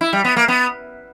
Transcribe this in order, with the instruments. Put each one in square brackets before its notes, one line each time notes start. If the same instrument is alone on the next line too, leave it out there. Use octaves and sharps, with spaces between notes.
[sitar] E4
G3
B3
A#3
B3